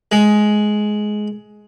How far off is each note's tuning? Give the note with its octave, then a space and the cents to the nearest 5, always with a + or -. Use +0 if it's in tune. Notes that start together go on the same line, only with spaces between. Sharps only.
G#3 +15